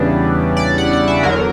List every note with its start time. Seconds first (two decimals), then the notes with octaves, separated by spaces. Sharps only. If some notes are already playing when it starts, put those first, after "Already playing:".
Already playing: E2 C#3 E3 G3 B3 D4
0.57 D5
0.78 F#5
0.93 F#5
1.08 E5
1.23 E2 D3 F#3 A#4